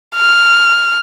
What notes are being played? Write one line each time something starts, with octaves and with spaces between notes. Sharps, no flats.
F6